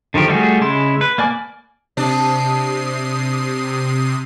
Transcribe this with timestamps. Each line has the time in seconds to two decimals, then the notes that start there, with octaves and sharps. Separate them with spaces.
0.14 D3 D#3 F3 G4
0.28 G3 A3 F#4 G#4
0.61 C#3 G#3 E4 C6
1.01 B4
1.18 A#3 D5 G#5 D6
1.97 C3 D4 D#6 C7